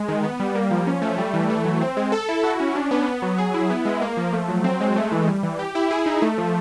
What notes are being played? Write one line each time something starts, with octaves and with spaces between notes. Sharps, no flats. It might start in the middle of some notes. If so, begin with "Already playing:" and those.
Already playing: G#3
D#3
B3
G3
A#3
F3
C#4
A3
G3
E3
A3
F#3
C4
G#3
A4
E4
F#4
C#4
D4
B3
B3
F#3
G#4
E4
B3
G#3
A#3
F3
A3
F#3
C4
G#3
A3
E3
G3
E3
G4
E4
G#4
D#4
A3
F3